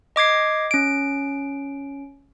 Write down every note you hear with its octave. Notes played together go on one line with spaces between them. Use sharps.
D#5 D6 G#6 C7
C#4 D7